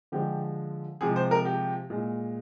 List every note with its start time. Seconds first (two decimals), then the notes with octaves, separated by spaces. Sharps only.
0.12 D3 F3 G#3 G4
1.01 C3 F3 G#3 G#4
1.16 C5
1.31 A#4
1.45 G4
1.90 A#2 G#3